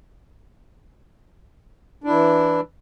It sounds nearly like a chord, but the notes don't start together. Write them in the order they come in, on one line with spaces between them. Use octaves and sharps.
D4 E4 E3